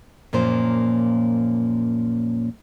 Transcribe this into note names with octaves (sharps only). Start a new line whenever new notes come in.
F#2 A#2 F3 A#3 C5